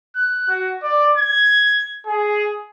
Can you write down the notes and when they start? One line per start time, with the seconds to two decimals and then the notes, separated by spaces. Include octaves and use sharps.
0.15 F#6
0.48 F#4
0.82 D5
1.17 G#6
2.07 G#4